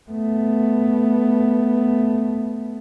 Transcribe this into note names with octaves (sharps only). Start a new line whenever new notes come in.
A3 B3